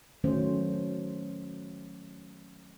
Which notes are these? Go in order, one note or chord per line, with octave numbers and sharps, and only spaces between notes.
D#3 F#3 A3 C#4 C5